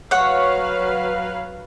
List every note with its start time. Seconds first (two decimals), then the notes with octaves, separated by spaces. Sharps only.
0.11 F#3 B4 C#5 F5 F#5